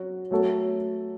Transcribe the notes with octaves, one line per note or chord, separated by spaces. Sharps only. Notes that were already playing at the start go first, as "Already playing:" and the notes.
Already playing: F#3 C#4 F#4
F#3 A3 C#4 F#4 A4